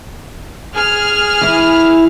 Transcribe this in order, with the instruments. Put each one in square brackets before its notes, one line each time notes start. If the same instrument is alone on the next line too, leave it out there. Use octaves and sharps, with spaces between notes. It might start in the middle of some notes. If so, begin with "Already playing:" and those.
[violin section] G#4 F6
[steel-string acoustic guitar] E3 E4